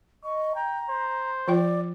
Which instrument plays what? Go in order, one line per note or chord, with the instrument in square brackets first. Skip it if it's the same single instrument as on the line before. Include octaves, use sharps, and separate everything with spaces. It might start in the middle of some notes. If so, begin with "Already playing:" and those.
[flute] D#5 [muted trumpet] C#6
[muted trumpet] G5 [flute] A#5
[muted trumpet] C5
[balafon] F3 F4 G5 [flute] D5